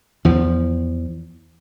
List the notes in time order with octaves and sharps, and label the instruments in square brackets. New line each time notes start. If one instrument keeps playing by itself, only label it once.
[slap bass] E2 F3